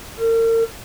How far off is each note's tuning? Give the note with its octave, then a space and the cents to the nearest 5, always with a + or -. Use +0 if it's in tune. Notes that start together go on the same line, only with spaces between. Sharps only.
A#4 -40